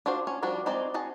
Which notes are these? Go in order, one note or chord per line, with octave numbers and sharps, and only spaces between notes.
D4 F4 F#4 C5
C#4
F3 G3 D4 F#4
G#3 C4 D#4 C5 D5
F#4 G#4 A5